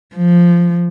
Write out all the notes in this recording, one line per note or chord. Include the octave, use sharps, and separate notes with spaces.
F3